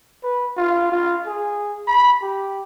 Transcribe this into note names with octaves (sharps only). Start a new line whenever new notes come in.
B4
F4
F4
G#4
B5
G4